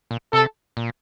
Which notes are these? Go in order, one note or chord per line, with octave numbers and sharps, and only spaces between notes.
A#2
C3 A4
A#2